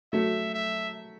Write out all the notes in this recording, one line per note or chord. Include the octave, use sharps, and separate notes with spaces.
F#3 A3 E5
E5